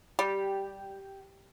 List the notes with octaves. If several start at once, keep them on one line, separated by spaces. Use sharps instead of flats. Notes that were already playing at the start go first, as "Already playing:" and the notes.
G3 G4